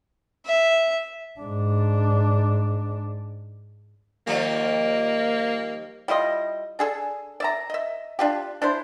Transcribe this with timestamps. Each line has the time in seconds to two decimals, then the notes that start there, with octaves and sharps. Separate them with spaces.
0.46 E5
1.40 G#2 D4
4.27 D#3 F3 G3 A#3
6.08 G3 E4 F4 D#5
6.79 D4 G#4 A4
7.40 D5 E5 A#5
7.70 D#5 E5
8.19 D4 F4 G4
8.62 D4 E4 C5